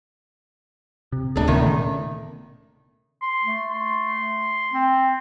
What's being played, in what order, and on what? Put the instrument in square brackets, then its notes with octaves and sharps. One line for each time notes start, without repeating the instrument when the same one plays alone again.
[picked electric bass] C3
[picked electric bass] D1 C3 A3 [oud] D4 G#4
[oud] E2 D#3
[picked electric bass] A#2 C#3 A3
[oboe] C6
[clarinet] A3
[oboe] C6
[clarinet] C4